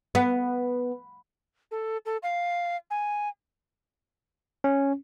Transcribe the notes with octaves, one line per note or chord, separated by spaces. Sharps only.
B3
A4
A4
F5
G#5
C#4